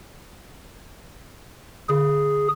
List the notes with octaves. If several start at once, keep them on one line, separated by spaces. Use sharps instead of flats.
D3 G#4